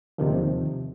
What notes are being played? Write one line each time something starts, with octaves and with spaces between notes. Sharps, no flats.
D#2 C3 D#3 F3